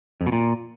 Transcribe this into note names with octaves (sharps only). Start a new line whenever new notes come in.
F2
B2
A#2